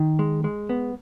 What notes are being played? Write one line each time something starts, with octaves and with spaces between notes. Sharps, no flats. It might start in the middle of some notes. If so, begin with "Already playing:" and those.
Already playing: D#3
G#3
G#3
B3